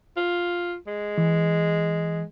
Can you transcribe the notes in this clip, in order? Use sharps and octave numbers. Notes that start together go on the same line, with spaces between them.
F4
G#3
E3